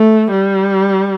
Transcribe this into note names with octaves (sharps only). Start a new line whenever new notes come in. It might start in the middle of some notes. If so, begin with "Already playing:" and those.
Already playing: A3
G3